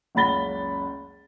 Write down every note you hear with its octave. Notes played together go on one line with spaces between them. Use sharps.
F#1 C#2 F#5 B5 A6 G7